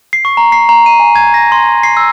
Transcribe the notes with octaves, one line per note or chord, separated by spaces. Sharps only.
C7
C#6
A#5
C7
A#5
D#7
G#5
G#6
A#6
C6
C7
E6